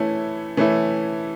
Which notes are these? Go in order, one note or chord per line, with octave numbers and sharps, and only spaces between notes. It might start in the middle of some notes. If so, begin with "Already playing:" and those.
Already playing: E3 A3 C#4 E4
E3 A3 C#4 E4